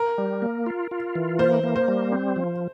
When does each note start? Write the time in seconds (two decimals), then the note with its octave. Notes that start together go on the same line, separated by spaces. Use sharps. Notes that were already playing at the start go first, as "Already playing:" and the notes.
Already playing: A#4
0.18 G3
0.42 A#3
0.66 F4
0.91 F4
1.15 E3
1.39 A#3 C5
1.64 A#3
1.76 C5
1.88 G3
2.12 C4
2.36 F3